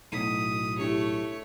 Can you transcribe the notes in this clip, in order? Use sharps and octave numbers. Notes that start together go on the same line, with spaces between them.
B1 A2 D#6 B6 D#7
A3 D4 E4 G4 C#5